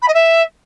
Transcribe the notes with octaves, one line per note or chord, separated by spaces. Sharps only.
B5
D#5
E5